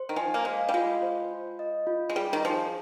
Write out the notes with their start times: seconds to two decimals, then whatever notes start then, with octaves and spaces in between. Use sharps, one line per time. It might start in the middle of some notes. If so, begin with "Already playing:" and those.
Already playing: C5
0.09 D#3
0.16 F3 G#5
0.34 A#3
0.44 G#3 F5
0.69 G3
0.74 G#3 F4
1.02 C5
1.31 F4
1.59 D#5
1.87 F4
2.10 G#3
2.15 G3 G#4
2.33 D#3
2.45 F3 G#5